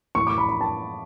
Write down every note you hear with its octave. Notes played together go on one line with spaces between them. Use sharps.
A2 E3 C#6
D6
B5
B5
A5